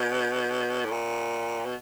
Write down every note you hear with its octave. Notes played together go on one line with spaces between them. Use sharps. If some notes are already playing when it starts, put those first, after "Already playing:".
Already playing: B2
A2
A#2
B2